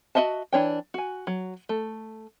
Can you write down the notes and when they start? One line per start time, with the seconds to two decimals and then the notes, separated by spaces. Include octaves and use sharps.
0.15 F#4 A#4 D#5 E5 A5
0.52 E3 D4 C#5 G5
0.94 F#4 G#5
1.27 F#3
1.69 A3